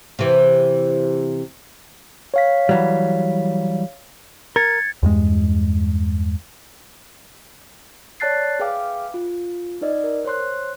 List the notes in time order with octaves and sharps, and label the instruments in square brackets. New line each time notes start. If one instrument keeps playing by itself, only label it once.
[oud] C3 E3
[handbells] C#5 F5 B6
[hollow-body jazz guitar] E3 F#3 G3
[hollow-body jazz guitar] A#4 [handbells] G#6 A6 C#7
[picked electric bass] E2 G2 G#3
[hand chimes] C#5 D5 A5 F#6 A6 C7
G#4 B4 E5 F5 G5 D6
F4
D#4 B4 D5 D#5
A#4
C5 C#5 C6 F#6